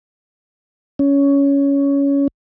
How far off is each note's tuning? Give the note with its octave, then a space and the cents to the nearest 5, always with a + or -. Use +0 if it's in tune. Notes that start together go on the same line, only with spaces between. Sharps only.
C#4 +15